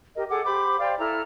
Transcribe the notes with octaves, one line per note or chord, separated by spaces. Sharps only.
G4 A#4 D#5
G#4 A4 F#5 D6
G4 C5 B5 D6
C5 D5 F5 G5
E4 A4 A#5 F6